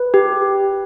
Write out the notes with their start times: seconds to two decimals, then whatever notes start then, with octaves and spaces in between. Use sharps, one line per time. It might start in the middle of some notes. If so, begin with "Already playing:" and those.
Already playing: B4
0.14 G4